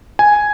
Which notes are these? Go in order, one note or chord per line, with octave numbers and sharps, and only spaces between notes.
G#5